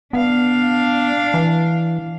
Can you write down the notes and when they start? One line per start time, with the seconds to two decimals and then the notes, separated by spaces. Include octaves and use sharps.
0.13 B3 D4 F5
1.34 E3